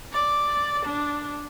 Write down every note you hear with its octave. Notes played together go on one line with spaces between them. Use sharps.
D5
D4